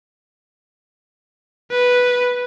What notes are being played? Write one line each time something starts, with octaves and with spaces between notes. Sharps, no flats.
B4